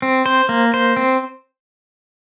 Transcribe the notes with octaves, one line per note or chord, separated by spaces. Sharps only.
C4
C5
A#3
C5
C4